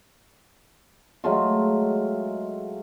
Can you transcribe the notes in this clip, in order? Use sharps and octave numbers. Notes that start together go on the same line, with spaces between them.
F#3 G#3 A3 F4